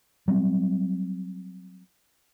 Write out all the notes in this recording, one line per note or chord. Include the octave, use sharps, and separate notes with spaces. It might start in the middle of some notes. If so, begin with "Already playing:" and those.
F#3 G3 C4